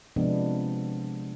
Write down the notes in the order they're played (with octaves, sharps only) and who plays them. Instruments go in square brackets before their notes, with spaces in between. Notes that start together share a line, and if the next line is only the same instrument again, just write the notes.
[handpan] C3 F3 G#3 B3 D4